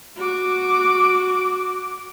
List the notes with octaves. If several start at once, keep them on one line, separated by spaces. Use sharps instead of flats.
F#4 D6